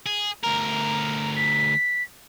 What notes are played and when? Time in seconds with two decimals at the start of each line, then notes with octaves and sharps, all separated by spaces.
0.06 G#4
0.43 D2 A#4 A#5
1.36 B6